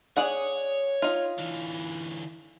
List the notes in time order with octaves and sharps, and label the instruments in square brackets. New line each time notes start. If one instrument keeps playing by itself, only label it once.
[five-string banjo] G#4 D5 F#5 [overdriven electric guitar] C#5
[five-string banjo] D#4 F4
[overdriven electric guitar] D3 E3